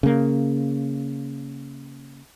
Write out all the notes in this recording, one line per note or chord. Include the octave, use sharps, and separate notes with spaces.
C#3 A#3